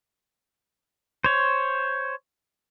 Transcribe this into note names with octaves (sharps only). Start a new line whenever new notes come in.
C5 C#5